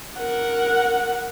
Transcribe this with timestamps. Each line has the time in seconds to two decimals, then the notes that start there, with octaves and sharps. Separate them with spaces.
0.18 A#4 F#5